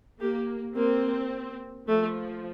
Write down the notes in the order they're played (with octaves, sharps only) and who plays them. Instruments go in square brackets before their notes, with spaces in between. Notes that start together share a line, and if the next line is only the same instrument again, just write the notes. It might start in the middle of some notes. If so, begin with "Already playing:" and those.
[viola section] A#3 [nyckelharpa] G4
[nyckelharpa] A#3 [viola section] C4
[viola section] F3 [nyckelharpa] A3